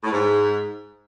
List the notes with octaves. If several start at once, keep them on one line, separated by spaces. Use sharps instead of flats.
A2
G#2